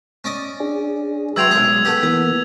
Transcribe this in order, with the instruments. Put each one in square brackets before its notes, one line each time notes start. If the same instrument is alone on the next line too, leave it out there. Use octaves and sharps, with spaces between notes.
[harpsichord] C#4 D5 D#5
[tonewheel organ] D4 G#4
[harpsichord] F#3 G5 C6 [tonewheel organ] B4 E5 [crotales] E6 G#6 F7
[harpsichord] B1 G#4 [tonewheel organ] G#3
[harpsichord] A3 B3 G4
[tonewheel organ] E3 A#3 [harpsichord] B3